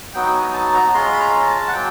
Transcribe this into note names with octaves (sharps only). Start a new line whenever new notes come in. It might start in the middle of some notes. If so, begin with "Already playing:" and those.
F#3 B3 D#4 F#4 G5
G#5
A5
A#5
G#3 C#4 F4 C6
B5
A#5
A5
F#5
F#3 A#3 G5